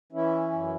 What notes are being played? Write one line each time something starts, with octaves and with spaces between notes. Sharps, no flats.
E3 C#4 E4
F#2